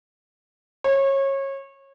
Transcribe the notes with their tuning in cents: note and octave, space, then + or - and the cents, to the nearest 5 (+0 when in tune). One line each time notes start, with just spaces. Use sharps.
C#5 -25